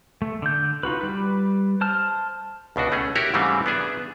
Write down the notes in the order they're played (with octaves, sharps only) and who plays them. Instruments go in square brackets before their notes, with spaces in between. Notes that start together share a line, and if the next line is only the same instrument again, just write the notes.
[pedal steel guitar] A3
D3 G6
D#4 F4 F#4 B4
G3 B4
C5 A5 F6
[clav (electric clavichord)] C#2 B2 D4 F#4
A3 C#4 G#4
E4 F#4 G4 A#4 C#5
G#2 C#3 E3 G3 A3 C4
B3 D4 G#4 E5